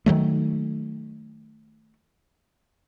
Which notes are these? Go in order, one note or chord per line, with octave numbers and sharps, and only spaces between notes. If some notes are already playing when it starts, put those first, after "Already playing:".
D#3 F3 F#3 A3